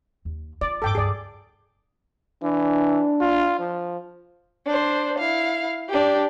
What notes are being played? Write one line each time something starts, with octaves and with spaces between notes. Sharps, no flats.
D#2
F4 D5
A1 G#2 A4 G5 D6
C#2 G2 G#4 D5
E3 D4
F4
F3
D4 C5
E4 F5
D4 G4